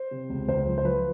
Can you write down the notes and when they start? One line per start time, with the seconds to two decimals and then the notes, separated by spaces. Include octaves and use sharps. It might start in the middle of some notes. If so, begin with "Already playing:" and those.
Already playing: C5
0.11 C3
0.30 C#2
0.48 C#2 C5
0.67 F3
0.78 C5
0.85 F3 B4